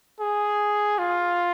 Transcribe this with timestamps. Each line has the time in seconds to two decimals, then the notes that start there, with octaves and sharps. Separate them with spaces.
0.20 G#4
0.98 F4